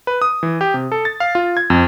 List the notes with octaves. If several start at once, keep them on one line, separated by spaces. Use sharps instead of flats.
B4
D#6
E3
G4
C3
A4
A6
F5
F4
G#6
F2